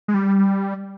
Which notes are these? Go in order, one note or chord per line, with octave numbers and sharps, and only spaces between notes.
G#3
G3